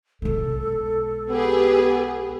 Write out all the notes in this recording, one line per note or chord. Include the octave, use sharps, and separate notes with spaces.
B1 G#3 A4
B3 G4 G#4 B4